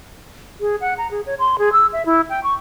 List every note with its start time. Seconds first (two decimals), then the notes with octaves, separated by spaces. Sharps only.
0.61 G#4
0.81 F#5
0.98 A#5
1.11 G#4
1.26 C#5
1.39 C6
1.59 G#4
1.73 E6
1.93 E5
2.06 E4
2.30 G5
2.44 C#6